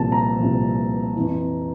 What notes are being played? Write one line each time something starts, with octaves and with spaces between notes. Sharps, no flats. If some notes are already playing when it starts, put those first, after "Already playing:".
Already playing: C2 A#2 F3 A5
A#5
C2 A#2 F3
F2 E3